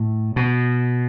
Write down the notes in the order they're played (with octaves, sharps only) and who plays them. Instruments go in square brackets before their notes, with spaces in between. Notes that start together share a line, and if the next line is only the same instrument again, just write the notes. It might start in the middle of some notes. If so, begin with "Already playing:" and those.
Already playing: [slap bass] A2
B2